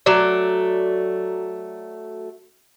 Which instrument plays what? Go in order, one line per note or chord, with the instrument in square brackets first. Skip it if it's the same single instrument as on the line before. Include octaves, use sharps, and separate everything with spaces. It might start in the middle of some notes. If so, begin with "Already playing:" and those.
[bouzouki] F#3 A3 D5